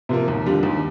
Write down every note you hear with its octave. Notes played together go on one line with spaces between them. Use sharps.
C3 F3 A#3
D#2
D3 G3 D4 F4
D#2